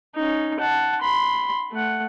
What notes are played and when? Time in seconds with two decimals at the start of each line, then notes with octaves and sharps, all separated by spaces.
0.16 C#4 D#4
0.59 F#5 A5
1.02 B5 C6
1.73 A3 F#5